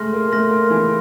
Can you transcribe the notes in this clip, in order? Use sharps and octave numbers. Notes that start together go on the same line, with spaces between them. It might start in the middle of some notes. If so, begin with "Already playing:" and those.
Already playing: G#3 A3 C6 F6 A#6
A#3
A3 C6 F6 A#6
A#3
E3